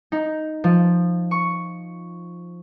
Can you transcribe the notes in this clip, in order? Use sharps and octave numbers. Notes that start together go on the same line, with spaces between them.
D#4
F3
C#6